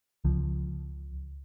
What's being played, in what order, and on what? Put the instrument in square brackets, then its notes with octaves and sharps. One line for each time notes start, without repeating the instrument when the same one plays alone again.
[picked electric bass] C#2 F3